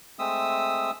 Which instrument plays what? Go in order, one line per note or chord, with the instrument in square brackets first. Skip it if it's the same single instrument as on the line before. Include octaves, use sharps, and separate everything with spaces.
[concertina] G#3 A3 C4 E5 D#6 E6